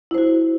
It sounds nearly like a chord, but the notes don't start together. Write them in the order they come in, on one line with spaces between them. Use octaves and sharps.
E4 C5 F#4